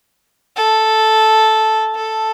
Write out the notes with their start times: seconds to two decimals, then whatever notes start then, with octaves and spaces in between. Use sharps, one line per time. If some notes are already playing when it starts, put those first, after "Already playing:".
0.56 A4
1.95 A4